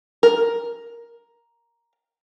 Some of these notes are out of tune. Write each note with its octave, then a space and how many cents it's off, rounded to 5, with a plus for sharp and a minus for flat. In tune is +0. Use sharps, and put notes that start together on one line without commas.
A#4 +5